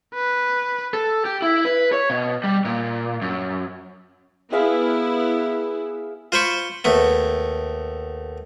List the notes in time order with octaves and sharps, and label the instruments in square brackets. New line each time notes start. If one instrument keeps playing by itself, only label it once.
[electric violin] B4
[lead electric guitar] A4
G4
E4
B4
C#5
B2
G3
A#2
F#2
[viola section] B3 E4 [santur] G#4 E5 F5
[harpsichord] F4 C5 B5 C#6
D#2 A3 B3